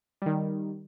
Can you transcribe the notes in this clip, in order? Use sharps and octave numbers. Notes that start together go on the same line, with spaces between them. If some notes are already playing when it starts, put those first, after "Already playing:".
D#3 G3